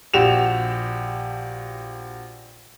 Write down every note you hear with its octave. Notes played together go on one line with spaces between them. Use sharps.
A#1 F#4 G4 E7 F7